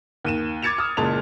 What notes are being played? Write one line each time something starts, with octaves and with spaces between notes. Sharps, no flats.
D#2 D#7 E7
D6 G#6 A6 C#7 E7 F7
D#6 F6
F#1 A#2 G#3 A5 F7